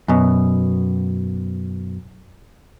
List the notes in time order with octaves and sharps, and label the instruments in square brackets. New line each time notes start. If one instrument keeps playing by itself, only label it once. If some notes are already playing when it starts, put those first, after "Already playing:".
[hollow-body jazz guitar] F#2 B2